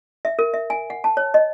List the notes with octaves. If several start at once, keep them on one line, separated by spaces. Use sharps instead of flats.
E5
A#4
E5
G#5
F#5
A5
C#5
D#5